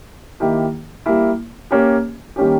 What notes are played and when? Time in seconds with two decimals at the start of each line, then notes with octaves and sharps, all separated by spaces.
0.40 D#3 A#3 E4 G4
1.06 G3 A#3 E4
1.71 A#3 C#4 G4 C#5
2.36 D#3 G3 A#3 C#4 G4